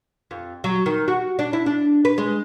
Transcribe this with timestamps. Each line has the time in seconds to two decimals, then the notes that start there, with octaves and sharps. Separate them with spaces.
0.31 F2
0.64 F#3
0.86 D#3
1.08 F#4
1.39 D4
1.53 E4
1.66 D4
2.05 B4
2.18 G#3